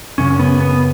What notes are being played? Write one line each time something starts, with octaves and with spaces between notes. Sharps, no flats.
F#2 C#3 C#4
B3
B3